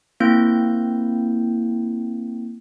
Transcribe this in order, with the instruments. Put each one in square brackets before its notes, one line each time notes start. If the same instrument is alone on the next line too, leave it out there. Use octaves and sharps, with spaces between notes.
[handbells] A#3 C4 E4 G6